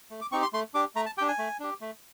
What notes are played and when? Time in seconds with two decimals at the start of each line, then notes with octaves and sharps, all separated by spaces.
0.10 A3
0.21 D6
0.32 C4 D#4 G4 C#6
0.42 C6
0.53 A3 C6
0.74 D4 G4 D6
0.96 A3 A#5
1.06 A5
1.18 D4 G4 G5
1.28 G#5
1.39 A3
1.60 D4 G4
1.81 A3